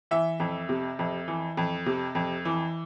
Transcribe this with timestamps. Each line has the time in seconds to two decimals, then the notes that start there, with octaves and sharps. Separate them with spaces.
0.11 E3 E5
0.40 F2
0.69 C3
0.99 F2
1.28 E3
1.57 F2
1.86 C3
2.15 F2
2.45 E3